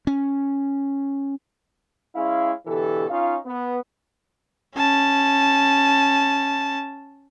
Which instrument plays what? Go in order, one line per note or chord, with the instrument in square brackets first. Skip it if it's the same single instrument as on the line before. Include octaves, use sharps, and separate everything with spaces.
[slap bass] C#4
[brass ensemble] G#3 C#4 E4 F5
B2 D3 E3 G4 A4
C#4 D#4 F4 F5
B3
[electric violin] C#4 A5